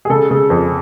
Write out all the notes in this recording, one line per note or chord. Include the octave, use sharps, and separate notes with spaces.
G#4
C#3 A4
C#3
F2